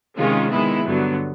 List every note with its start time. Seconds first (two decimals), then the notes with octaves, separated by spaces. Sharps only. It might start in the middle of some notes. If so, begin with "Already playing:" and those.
0.17 C3 D#3 G#3 C#4 F4
0.51 D#3 G#3 B3 E4
0.85 G2 D3 F#3 B3